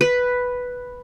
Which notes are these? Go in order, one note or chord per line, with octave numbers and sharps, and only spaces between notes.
B4